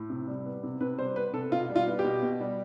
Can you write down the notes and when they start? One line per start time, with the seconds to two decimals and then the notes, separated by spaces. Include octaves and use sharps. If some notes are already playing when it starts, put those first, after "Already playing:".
Already playing: A2
0.10 C3
0.28 G3
0.45 B3
0.63 C3
0.81 C3 B4
0.98 G3 C5
1.16 B3 B4
1.33 C3 A4
1.51 B2 F4
1.69 G3
1.76 F4
1.87 B3
1.99 G4
2.04 B2
2.22 B2
2.41 G3